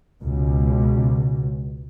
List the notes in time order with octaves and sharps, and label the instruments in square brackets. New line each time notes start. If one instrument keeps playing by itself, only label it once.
[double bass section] C#2 B2